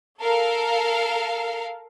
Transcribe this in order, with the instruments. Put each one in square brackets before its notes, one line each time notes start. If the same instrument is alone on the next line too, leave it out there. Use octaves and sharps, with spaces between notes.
[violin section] A4 A#4 F5